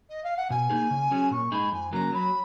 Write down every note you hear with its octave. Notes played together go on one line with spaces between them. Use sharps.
D#5
F5
F#5
B2 G#5
A#3 D#4 G#4
C#3
F#3 C#4 G#4
A#2 C#6
G#3 D#4 G#4 B5
F2 G#5
C#3 F#3 A#3 A#5
F#3 B5